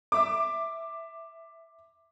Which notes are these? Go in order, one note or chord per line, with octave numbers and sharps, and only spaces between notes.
E5 D6